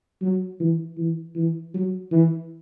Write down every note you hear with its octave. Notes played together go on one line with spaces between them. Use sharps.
F#3
E3
E3
E3
F#3
E3